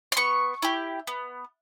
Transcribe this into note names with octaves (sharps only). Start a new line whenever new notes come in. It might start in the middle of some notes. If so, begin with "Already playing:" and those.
C6
B3 C#6
E4 G4
B3